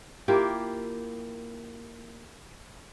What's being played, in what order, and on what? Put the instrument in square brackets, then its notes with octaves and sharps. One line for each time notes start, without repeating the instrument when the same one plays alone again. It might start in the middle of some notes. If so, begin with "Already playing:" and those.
[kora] A#3 E4 F4 G4